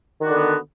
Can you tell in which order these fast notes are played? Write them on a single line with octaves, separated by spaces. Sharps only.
D#3 F#4 D4 D3 B3